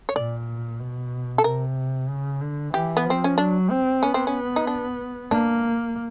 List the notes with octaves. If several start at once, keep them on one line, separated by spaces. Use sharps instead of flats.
C#5
A#2 D5
B2
A4
C3 A#4
C#3
D3
E3 G4
B3
F3 C4
C#4
F#3 D4
C4
B3 C#4
C4
C#4
D#4
D4
A#3 D4